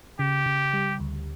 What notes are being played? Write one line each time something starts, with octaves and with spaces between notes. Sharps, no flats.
C#3 G4
C#3
G3
D2